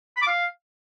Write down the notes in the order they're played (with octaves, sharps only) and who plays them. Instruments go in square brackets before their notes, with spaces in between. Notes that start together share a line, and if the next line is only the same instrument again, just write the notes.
[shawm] B5
D6
F5